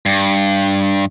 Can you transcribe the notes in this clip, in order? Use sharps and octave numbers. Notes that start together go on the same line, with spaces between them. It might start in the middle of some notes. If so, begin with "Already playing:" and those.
G2